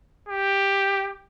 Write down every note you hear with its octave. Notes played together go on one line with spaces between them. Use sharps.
G4